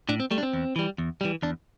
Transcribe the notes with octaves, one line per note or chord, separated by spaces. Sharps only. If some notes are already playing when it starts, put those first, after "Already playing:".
A2 D4
C4
G3 A3
D4
C4
E2
E3 G3
E2
E3 G3
E2 D4